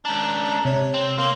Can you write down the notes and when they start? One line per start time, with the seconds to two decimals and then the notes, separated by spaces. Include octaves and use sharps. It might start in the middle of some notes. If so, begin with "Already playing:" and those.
0.05 C#2 D4 A#5
0.42 A#5
0.65 C3 C#5
0.94 C4
1.18 A#3 C6